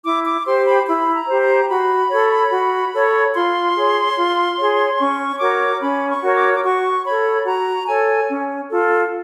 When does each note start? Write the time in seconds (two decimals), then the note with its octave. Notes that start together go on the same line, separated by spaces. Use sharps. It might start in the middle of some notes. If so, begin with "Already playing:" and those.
0.04 E4 D6
0.25 D6
0.45 G4 C5 C6
0.65 B5
0.86 E4 B5
1.14 A#5
1.27 G4 C5
1.42 A#5
1.69 F#4 B5
2.10 A4 C#5
2.51 F#4
2.92 A4 C#5
3.34 F4 C6
3.75 G#4 C#5
4.16 F4
4.57 G#4 C#5
4.99 C#4 C#6
5.40 F#4 A#4 C#5 D6
5.81 C#4 B5
6.09 C#6
6.22 F#4 A#4 C#5
6.36 D6
6.53 D6
6.63 F#4 C#6
7.04 A4 C#5 B5
7.46 F#4 A#5
7.87 A4 C#5 G#5
8.29 C#4
8.70 F4 A4